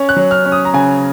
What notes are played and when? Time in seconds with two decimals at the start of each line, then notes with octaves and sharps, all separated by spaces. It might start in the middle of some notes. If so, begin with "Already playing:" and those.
Already playing: C#4
0.09 F#6
0.16 F#3
0.31 F6
0.46 C#4
0.52 D#6
0.65 A#5
0.74 C#3 G#5